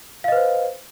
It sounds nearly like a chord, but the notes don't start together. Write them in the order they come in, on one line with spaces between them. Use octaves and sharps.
F5 D#5 B4 C5